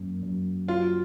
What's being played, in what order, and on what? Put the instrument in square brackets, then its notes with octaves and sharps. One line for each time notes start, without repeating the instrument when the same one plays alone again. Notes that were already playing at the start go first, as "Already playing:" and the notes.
Already playing: [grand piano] F#2 F#3 A#3
F#2
[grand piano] F#3 [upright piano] F4